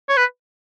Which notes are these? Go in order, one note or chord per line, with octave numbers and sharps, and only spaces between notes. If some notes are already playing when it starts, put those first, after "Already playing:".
C#5
B4